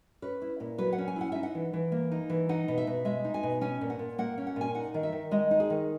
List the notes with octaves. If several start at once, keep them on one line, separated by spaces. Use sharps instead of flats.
C#4 B4
E4
A#2
F#3 B4
F#5
C#4
G#5
E4 F#5
D#4 E5
F#5
E3
E3
A#3
D#4
E3
D#4 F#5
B2
E5
B2
G#3 E5
D#4
G#5
B2
C#4 G#5
A#2
F#5
A#2
A#3 F#5
C#4
F#5
A#2 G#5
D#4 F#5
D#3
E5
D#3
G#3 D#5
D#4
G#4
D#3